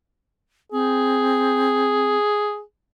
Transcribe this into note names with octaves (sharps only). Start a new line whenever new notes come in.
C4 G#4